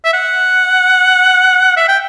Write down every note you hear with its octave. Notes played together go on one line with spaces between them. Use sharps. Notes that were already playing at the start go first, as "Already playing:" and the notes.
E5
F#5
E5
G5